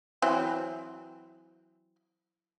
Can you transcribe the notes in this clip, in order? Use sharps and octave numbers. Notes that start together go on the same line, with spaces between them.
E3 F#3 C4